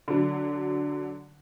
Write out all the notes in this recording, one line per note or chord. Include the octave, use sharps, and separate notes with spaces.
D3 F#3